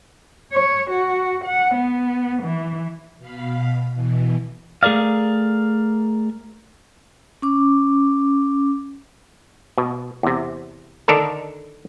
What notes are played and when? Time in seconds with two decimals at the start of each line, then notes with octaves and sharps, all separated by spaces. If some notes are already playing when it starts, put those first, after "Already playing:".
0.52 C#5
0.90 F#4
1.45 F#5
1.75 B3
2.43 E3
3.19 B2 F5 B5
3.93 B2 E3
4.83 A3 G#4 A#4 D5 F5
7.42 C#4 D6
9.78 B2
10.23 E2 C3
11.08 D3 D#3 D4 A4 A#4